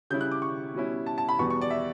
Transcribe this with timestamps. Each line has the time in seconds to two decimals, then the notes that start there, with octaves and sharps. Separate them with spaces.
0.10 C#3 G3 C#4 E4 G6
0.21 F#6
0.32 D6
0.42 C#6
0.75 B2 G3 C#4 E4
1.06 A5
1.18 A5
1.29 B5
1.39 E2 B2 G3 B3 C#6
1.50 C#6
1.61 D5
1.70 E5